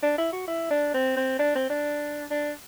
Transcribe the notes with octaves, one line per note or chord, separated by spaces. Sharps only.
D4
E4
F#4
E4
D4
C4
C4
D4
C4
D4
D4